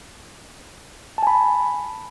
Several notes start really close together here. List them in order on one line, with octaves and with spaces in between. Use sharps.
A5 G#5 B5